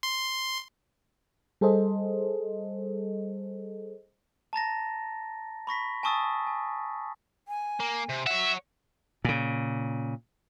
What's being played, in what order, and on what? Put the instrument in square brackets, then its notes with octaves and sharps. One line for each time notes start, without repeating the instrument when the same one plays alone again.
[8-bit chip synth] C6
[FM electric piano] G3 G#4 A4 C5 D#5
[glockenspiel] A5 A#5 A6 A#6
B5 C#6 A#6 B6
G#5 A5 C#6 D#6 E6 A6
G#5
[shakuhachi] G#5
[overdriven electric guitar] A#3
C3
[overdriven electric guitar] C#5 F#5 [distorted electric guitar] E5
[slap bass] A#2 C#3